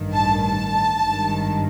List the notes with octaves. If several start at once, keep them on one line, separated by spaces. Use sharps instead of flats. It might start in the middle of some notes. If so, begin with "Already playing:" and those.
Already playing: A1 G2 D#3
A5
A5
G#1 G2 D#3